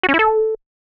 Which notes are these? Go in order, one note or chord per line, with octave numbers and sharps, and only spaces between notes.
F#4
C#4
E4
A4